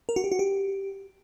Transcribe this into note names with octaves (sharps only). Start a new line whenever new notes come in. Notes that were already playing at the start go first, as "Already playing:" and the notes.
A#4
F#4
G4
F#4
G4